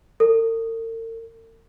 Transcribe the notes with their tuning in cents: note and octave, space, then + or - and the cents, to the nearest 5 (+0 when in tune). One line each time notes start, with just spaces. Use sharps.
A#4 -45